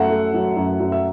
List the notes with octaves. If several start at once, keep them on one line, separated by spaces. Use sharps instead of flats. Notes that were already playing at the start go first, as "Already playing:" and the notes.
Already playing: F#2 A3 E5 F#5
A3
F#3
F#2
F#2
E5